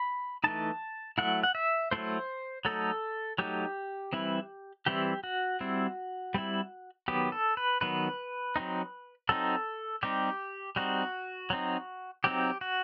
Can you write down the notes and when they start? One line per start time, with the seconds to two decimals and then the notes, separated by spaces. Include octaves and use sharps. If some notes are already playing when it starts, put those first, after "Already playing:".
Already playing: B5
0.44 E3 A3 D#4 A5
1.18 F#3 A3 E4 F#5
1.43 F#5
1.55 E5
1.91 F#3 A3 E4 C5
2.65 F#3 A3 D#4 A4
3.38 F#3 A3 D#4 G4
4.13 E3 G3 C4 E4
4.86 E3 G3 C4 E4 G4
5.24 F#4
5.60 G3 C4 E4
6.34 G3 C4 E4
7.08 D#3 F#3 B3 G4
7.32 A4
7.57 B4
7.81 D#3 F#3 B3 B4
8.56 F#3 C4 D#4
9.29 F#3 C4 D#4 A4
10.03 G3 C4 D#4 G4
10.76 G3 C4 D#4 F#4
11.50 F#3 C4 D#4
12.24 F#3 C4 D#4 G4
12.61 F#4